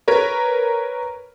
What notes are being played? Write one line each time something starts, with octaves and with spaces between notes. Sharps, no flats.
A#4 B4 C#5